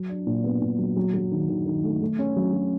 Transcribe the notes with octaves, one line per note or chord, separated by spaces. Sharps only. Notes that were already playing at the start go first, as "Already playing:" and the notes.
Already playing: F#3
D4
A#2
B3
A#2
F#3
F#3
F#3
D#3
D#3
D#3
A3
A3
C#4
F#3
F#3